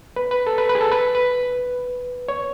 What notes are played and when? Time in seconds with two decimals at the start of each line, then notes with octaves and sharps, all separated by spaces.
0.16 B4
0.31 B4
0.47 A4
0.58 B4
0.69 B4
0.75 G#4
0.81 A4
0.91 B4
1.15 B4
2.28 C#5